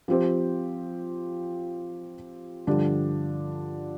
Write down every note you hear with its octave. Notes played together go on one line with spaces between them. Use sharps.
F3 C4 G4 C5
G2 D3 F3 D4 G4